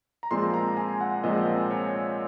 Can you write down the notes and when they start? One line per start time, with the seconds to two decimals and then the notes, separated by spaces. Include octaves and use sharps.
0.23 A#5
0.31 A#2 F3 G#3 C4 C6
0.54 A#5
0.77 G#5
1.01 F#5
1.24 A#2 F3 G#3 C4 D#5
1.71 C#5